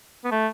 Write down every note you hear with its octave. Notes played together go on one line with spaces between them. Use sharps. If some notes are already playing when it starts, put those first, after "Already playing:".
B3
A3